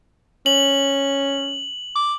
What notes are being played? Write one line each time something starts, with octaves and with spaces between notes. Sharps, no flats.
C#4 F#7
D6